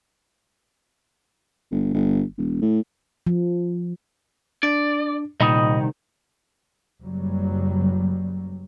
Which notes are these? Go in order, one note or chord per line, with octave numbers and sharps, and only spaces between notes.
G1
G1
E1
A2
F3
D4 D5
C2 A#2 D#3 D#5 B5 D#6
F#1 F#3 G3